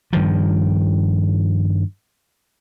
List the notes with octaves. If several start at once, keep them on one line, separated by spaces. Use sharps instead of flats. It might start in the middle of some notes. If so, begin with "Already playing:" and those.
G2 D#3 F3